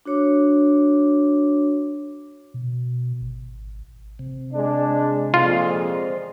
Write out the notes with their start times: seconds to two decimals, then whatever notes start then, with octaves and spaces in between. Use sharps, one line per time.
0.06 D4 F#4 C#5 D6
2.54 B2
3.21 G#1
4.19 C3
4.54 G#3 D4
5.34 F2 A#2 G#3 F4 F5
5.70 C5